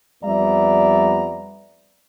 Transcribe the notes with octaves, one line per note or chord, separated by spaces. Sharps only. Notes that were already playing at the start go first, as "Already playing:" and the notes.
F2 G3 B3 D5 E5 A#5